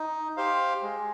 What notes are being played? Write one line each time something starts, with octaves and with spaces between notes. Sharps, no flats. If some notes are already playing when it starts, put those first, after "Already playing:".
Already playing: D#4
G4 C5 F5
G#3